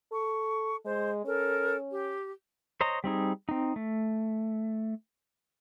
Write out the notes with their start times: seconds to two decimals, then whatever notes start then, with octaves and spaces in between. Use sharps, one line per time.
0.12 A4 C#6
0.85 G#3 C5
1.25 C#4 A4 A#4
1.91 G4
2.81 C5 C#5 D#5 A#5
3.04 G3 C4 D#4 G#4
3.49 C4 D#4
3.76 A3